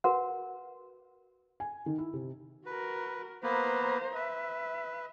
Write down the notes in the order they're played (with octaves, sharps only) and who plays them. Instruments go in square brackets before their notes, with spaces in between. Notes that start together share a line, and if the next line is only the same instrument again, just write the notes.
[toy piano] F#4 A#4 B4 F#5
[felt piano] G#5
D#3
E4
C3
[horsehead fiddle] F#4 A#4 [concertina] B4
[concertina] A#3 B3 B4 [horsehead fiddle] C5 A#5
[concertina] B4 [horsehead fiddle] E5